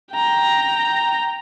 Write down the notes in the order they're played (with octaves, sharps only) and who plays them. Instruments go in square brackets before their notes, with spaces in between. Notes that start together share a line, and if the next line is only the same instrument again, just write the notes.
[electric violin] G5 A#5